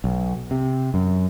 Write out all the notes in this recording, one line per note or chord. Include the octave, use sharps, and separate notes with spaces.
B1
C3
F#2